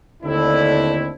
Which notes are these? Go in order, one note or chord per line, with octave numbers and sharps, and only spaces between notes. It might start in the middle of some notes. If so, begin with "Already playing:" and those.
D#2 D3 A3 C4 D4 E4